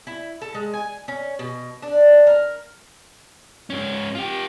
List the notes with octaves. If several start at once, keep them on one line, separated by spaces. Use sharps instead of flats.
E4
A4
G#3
G#5
C#4
B2
D4
A#4
G#2 C#4
F4 G4